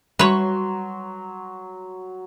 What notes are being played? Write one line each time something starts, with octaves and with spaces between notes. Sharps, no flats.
F#3 G3 B4 C#5 C6